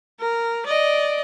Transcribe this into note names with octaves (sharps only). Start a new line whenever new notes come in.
A#4
D5 D#5